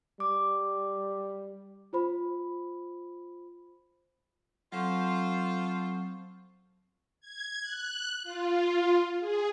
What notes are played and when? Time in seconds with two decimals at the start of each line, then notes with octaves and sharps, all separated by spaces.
0.20 G3 D6
1.93 F4 C5 B5
4.72 F#3 C4 F4 A4 C5 C#6
7.20 G#6
7.61 F#6
8.23 F4
9.19 G#4